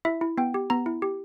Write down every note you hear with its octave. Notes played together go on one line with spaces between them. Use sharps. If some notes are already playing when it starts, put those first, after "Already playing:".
E4 E5
E4
B3 G5
G4
B3 A#5
E4
G4